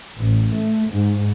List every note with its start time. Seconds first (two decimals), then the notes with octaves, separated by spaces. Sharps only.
0.18 A1
0.54 A3
0.90 G#2